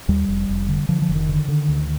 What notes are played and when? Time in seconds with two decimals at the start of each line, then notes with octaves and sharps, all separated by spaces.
0.08 D#2 G3
0.29 F1
0.49 F1
0.68 D3
0.89 D3 F3
1.02 F3
1.09 F1
1.15 D#3
1.29 D3
1.48 D3
1.69 D2